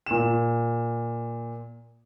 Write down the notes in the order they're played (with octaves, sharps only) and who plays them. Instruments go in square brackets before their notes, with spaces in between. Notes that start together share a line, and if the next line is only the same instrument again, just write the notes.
[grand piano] A#2 E7